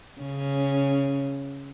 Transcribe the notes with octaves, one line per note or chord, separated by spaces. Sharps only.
C#3 C#4